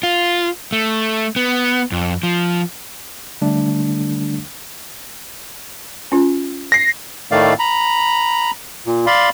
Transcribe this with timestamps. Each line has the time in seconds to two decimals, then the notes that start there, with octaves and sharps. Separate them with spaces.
0.03 F4
0.72 A3
1.36 B3
1.92 F2
2.23 F3
3.41 D3 G3 A3 D4
6.12 C#4 F4
6.72 A#6 C7
7.31 A2 D#3 A3 D5 F5
7.59 A#5 B5
8.86 A#2
9.07 D5 F5 B5 C6